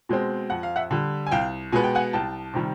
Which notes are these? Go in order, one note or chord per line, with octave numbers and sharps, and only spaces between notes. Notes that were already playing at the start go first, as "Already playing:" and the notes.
B2 G#3 C4
F2 F#5
F5
E5 F#5
D3 G3
G#5
C2 F5 G5
B2 G#3 B3 G#5
G5
F#5 G#5
C2 G5 A5
C3 D#3 G3